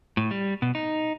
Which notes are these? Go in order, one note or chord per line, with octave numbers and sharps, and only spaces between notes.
A2
G3
B2
D#4